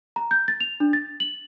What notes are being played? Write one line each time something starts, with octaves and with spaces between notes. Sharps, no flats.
A#5
G6
A6
F7
D4
A6
F#7